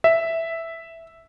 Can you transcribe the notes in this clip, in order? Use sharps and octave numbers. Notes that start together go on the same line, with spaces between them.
E5